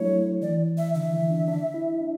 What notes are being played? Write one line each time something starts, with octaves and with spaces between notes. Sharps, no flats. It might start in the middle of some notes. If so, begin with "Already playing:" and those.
Already playing: F#3 A3 D4 E4 C#5
E3 D5
E5
D3 E5
E3
D4
D4
E4
D4